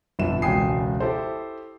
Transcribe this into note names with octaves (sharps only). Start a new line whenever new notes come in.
G1 F2 B2 E5 E7
E1 C#2 G5 G#5 D#6 C7
E4 G4 A4 C5